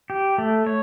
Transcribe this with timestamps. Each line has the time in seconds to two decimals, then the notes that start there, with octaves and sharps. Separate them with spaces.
0.10 G4
0.38 A3
0.67 C#5